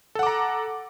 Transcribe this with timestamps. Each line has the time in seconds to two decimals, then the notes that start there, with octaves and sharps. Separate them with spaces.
0.15 A4
0.19 F#5
0.23 D6
0.27 A#5